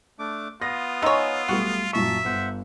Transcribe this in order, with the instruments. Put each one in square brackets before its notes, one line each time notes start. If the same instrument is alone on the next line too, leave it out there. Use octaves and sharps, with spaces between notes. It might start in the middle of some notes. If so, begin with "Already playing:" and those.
[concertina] A3 D4 D6
[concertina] B3 D#6 [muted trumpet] F4 [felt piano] A#6
[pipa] D#4 C#5 [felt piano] G#5 C6 E6
[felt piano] B1 G3 A3 [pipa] F#4
[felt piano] F#2 A#2 C#6 [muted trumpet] E5 [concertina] A5
[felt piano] G1 [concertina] C5 F#5